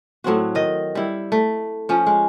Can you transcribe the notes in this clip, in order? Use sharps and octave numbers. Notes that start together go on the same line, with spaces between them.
A2 F#3 C4 F#4
D#3 D#5
G3 E4
A3
F3 C#4
G#3